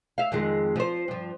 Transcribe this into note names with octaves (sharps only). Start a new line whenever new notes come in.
E5 F5
F2 D#3 G#3
F3 C5
G2 F3